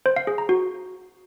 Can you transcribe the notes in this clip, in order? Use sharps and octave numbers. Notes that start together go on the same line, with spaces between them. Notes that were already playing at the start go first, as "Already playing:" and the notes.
C5
F5
G#4
A#5
F#4